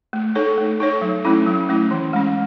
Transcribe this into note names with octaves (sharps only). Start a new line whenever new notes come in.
A3
D#4 A4 C#5
A3
D#4 A4 C#5
F#3
A3 C#4 E4
F#3
A3 C#4 E4
E3
G#3 C#4